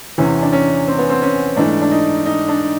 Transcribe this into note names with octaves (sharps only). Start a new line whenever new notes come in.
E2 C3 E3 C#4
D4
C#4
C4
B3
C4
C#4
G#2 E3 A3 D4
D4
D#4
D#4
D4